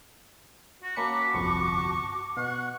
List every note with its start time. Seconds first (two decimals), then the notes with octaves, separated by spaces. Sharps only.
0.82 F#4
0.96 A#3 C#4 F#4 A5 B5 D6 C#7
1.34 G1 C2 F2 C#6
2.37 B2 F#5 C#6